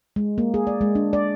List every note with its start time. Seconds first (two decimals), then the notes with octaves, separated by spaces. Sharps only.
0.16 G#3
0.38 A#3
0.54 G#4
0.67 D5
0.81 G#3
0.95 D4
1.13 D5